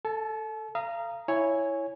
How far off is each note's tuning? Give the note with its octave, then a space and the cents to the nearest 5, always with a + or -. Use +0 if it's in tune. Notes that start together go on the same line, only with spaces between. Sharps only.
A4 +10 A5 -40
F5 -30 A#5 +0 D#6 +0
E4 +0 C#5 +0 G#5 +0